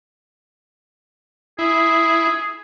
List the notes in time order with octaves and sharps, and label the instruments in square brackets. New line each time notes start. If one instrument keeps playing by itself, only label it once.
[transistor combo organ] E4 [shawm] G#4